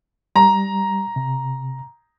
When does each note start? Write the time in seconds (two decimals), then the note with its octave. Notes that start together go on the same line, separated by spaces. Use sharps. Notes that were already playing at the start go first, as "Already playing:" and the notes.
0.36 G3 A#5
1.16 C3